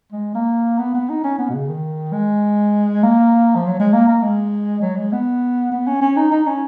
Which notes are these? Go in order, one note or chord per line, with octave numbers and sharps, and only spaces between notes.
G#3
A#3
B3
B3
D#4
C#4
B3
B2
C#3
D#3
G#3
A#3
F3
F#3
G#3
A#3
A#3
G#3
F#3
G#3
B3
B3
C#4
C#4
D#4
D#4
C#4